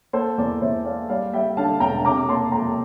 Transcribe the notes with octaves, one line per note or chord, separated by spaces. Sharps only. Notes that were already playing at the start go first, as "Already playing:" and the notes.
A#3 A4 C5
E2 A#4 D5
E2 C5 E5
A#3 D5 F5
G3 D5 F5
G3 E5 G5
D3 F5 A5
E1 G5 A#5
C3 A#5 D6
D6
A#3 A5 C6
F2 G5 A#5